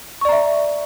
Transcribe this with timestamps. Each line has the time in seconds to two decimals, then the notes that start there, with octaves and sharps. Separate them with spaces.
0.21 C#6
0.25 D5
0.29 A#5
0.32 E5